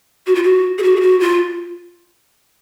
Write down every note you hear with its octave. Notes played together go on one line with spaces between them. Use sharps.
F#4
F4
F#4
G#4
F#4
G#4
F#4
F4